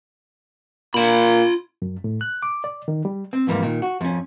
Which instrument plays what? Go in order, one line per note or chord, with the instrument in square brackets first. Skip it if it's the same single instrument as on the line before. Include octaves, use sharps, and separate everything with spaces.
[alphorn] A#2 [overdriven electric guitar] F4 B5
[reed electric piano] F#2
A2
F#6
D6
D5
D#3
G3
[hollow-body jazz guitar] C4
F2 G#2 E3 G3 A#3
A#2 D#3
F#4
F2 C#4